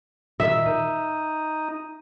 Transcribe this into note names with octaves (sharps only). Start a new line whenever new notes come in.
A#2 D#3 E5
D#4